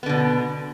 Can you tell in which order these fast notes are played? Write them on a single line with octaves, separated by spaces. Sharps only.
B3 D3 B2